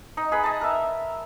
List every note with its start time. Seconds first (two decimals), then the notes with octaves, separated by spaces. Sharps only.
0.17 D#4
0.32 G#4 B4 B5
0.44 D#5 A5
0.61 A#4 E5